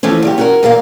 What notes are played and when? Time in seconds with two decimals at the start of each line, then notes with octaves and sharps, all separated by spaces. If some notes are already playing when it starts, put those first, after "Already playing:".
0.03 E3 F3 A3 C#4
0.22 A#2 F#3 G4
0.38 C#4 F#4 A#4
0.63 E2 A#2 A#4 F5